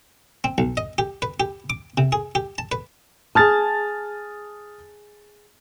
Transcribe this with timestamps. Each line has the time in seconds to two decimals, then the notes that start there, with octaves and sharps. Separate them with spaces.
0.44 C4
0.58 B1
0.77 D#5
0.98 G4
1.22 B4
1.40 G4
1.70 D6
1.98 C3
2.12 G#4
2.35 G4
2.58 A5
2.72 B4
3.35 G#4 A5 D#6 F6 A6